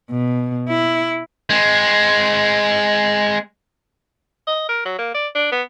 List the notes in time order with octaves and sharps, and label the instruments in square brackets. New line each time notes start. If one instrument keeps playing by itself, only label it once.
[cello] B2
E4
[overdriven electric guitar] G#3 C4
[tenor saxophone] D#5
A#4
F#3
A#3
D5
D4
B3